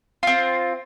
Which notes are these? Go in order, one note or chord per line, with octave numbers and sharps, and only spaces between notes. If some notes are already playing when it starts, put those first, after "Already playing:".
C4 F4